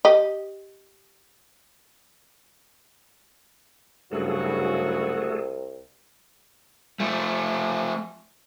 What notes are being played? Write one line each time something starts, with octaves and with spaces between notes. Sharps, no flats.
G4 D#5
F#1 C2 G2 C#3 A3 F#4 G#4 A4
F3 A3